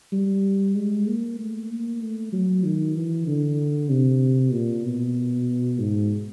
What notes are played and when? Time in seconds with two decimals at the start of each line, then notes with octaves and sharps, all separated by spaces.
0.12 G3
0.76 G#3
1.07 A#3
1.39 A3
1.70 A#3
2.01 A3
2.32 F#3
2.64 D#3
2.95 E3
3.27 D3
3.90 C3
4.53 A#2
4.85 B2
5.79 G#2